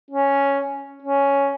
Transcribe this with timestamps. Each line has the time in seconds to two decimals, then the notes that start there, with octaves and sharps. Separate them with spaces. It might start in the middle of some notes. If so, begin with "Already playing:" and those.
0.11 C#4
1.03 C#4